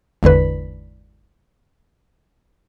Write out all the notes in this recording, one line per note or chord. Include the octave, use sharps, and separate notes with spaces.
G#1 E2 D3 B4